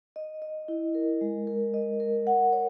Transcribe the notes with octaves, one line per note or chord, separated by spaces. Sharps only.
D#5
D#5
E4
A#4
G#3
A#4
D#5
A#4
F#5
C#5